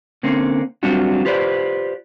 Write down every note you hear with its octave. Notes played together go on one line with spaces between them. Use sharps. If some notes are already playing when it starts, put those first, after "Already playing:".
D3 A#3 C4 C#4
F#3 G3 C4 D4 F4 F#4
F4 G4 B4 C5 D5